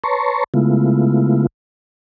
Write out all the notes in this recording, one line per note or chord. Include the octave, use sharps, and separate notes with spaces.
B4 C#5 A5 A#5 C6 C#6
C#3 G#3 A3 B3 E4 F4